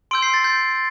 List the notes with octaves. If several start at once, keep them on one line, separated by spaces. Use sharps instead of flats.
C6 E6 G6 D7
C7
A6
G6